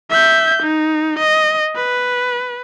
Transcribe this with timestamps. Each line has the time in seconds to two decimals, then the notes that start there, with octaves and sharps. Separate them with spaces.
0.11 E5 G6
0.63 D#4
1.19 D#5
1.76 B4